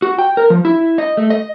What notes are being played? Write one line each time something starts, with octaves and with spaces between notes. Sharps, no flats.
F#4
G5
A#4
F3
E4
D#5
A3
D#5